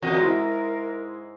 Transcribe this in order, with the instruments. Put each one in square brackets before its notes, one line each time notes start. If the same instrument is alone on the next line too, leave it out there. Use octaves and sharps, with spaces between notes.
[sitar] E2 D#5 [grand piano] F#4 [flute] A#4
[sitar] G#2 [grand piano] G#3 E4